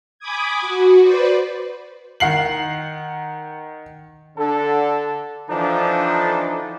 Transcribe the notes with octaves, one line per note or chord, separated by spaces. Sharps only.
G#5 B5 D6 D#6 G#6
F#4
B4 C5 D5
D#3 F#5 C7 F#7
D3 A4
D3 E3 F3 D4 D#4 A4